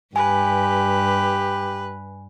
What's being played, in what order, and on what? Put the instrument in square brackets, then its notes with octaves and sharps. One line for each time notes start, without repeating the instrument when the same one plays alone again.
[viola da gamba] G2 [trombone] G4 [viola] B4 [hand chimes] G#5